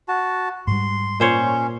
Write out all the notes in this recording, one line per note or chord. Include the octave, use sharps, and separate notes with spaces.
F#4 A5
G#2 G3 C6
A#2 C#4 C5 C#5